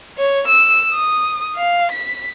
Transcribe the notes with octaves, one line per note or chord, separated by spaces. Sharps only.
C#5
E6
D#6
F5
B6